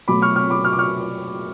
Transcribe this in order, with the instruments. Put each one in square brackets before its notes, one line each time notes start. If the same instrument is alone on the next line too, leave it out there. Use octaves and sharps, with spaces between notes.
[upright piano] B2 F#3 A3 B5 D6
C#6 F6
C#6 F6
B5 D6
C#6 F6
D6
C#6 F6